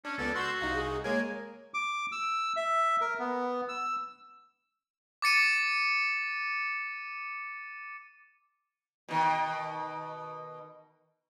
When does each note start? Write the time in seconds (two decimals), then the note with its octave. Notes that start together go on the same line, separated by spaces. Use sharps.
0.05 C#4 D4
0.18 C#2 B3 A4 D5
0.35 F#4 C6 E6 G6
0.61 C2 D#4 F5
0.74 G#4
1.04 G#3 A#3 A#4 C#5 G#5
1.74 D6
2.12 E6
2.57 E5
3.01 A#4
3.19 B3
3.68 E6
5.22 D6 A6 C#7 D#7
9.09 B2 D#3